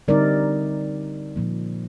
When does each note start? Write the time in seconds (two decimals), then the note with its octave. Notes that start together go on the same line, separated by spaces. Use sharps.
0.08 D3 G3 C4 D#4 A#4 D5
1.36 A#2 F3 A#3